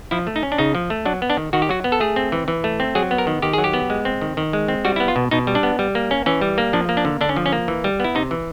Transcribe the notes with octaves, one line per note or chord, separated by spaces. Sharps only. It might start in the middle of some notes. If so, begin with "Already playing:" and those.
F3 E4
A3
D#4
C#4
D4
C#3 D#4
F3
A3
F#3 D4
B3
D4
D#3
D#3 F#4
G4
F#3 F#4
B3
A4
A3 G#4
C4
E3
E3
A3
C4
F#3 G#4
B3
A#4
D#3
D#3 G4
F#3 G#4
G4
B3
G#3
C4
D#3
D#3
G#3
C4
G3 F#4
B3 E4
F4
B2
B2 D#4
G3
D4
B3
G3
A#3
C#4
E3 C#4
G3
A#3
F3 D4
A#3
D4
D3
D3 D4
C#4
F3
C#4
A#3
E3
G3
B3 E4
C3 D#4
E3